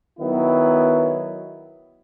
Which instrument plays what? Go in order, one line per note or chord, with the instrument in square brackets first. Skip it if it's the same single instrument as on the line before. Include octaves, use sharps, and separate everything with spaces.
[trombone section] D#3 F#3 B3 E4